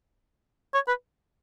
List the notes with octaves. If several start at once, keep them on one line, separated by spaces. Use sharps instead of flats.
C#5
B4